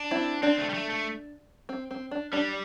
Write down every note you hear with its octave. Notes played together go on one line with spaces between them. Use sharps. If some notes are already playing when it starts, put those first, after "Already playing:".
Already playing: D4
C4 E4
C4 D4
A3
G3
A3
A3
C4
C4
D4
G3 D4